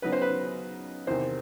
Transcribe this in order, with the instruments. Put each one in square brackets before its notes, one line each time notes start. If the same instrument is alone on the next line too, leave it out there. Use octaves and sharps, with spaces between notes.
[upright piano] C#3 F#3 B3 D#4 [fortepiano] B4
[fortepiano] C5
B4
[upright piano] E2 C3 D#3 [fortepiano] C5